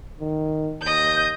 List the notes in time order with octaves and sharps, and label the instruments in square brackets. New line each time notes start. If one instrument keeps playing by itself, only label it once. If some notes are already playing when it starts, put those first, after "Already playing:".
[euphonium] D#3
[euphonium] D#2 [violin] D#5 G6